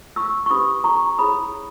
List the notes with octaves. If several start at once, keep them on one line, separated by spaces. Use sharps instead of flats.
C#6 E6
C#6
C#4 E4 G4 B4 B5 D#6
A#5 C#6
E4 G#4 C#5 B5 D#6